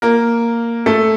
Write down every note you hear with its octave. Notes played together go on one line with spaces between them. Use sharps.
A#3 A#4
A3 A4